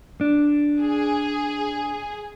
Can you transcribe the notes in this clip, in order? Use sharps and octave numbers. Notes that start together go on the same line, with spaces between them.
D4
G#4